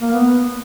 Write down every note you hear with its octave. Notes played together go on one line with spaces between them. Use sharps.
A#3
B3